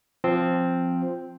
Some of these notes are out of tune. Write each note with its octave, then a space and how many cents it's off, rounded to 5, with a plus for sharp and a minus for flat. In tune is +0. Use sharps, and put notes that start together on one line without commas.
F3 +0 C4 +0